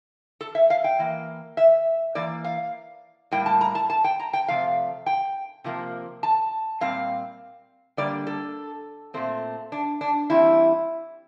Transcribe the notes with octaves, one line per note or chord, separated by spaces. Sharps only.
A4
E5
F5
G5
E3 A#3
E5
E3 A#3 D5
F5
A2 G3 A#3 G5
A5
A#5
A5
A5
G5
A#5
G5
C3 F3 A3 F5
G5
C3 F3 A#3
A5
A#2 G3 C4 F5
D3 G3 A#3 D5
A4
A#2 A3 C4
D4
D4
E3 G3 C4 E4